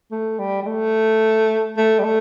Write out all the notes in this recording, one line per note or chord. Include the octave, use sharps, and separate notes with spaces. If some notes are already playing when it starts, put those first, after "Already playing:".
A3
G3
G3
A3
A3
G3
A3